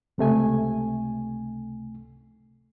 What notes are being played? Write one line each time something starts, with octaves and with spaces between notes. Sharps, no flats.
C#2 C3 A3 G#5